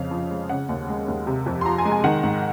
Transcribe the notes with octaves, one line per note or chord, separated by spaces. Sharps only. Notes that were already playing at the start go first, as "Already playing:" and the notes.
Already playing: F2 C#3 F5
F3
G#3
C#3 F#5
D#2
G#3
D#2
C3
F2
C6
F3 A#5
G#5
G#3
G#5
D#3 F#5
G#2